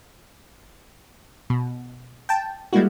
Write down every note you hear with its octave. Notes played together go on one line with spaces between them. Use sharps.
B2
G5 A5
G3 G#3 A#3 E4 F#4